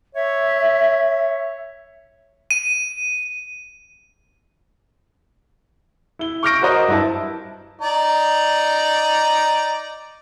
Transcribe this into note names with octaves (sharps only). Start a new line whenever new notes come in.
C#5 E5
D#7
E4 G7
C#6 D6 F6 G6 A#6 D7
F#4 A#4 C5 D#5
G2 E4 A5
D#4 D5 A#5